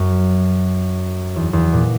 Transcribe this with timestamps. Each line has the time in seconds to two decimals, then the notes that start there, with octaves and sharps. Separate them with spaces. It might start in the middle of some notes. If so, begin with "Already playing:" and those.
Already playing: F#2
1.36 E2
1.53 E2
1.73 A#2